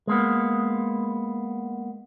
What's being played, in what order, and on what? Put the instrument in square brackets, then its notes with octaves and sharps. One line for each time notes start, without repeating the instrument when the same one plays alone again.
[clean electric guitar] G#3 A#3 B3